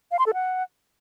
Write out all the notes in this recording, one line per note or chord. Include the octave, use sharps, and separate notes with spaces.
F5
C6
A4
F#5